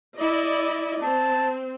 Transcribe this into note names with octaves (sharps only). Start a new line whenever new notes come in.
E4 D5 D#5
C4 A5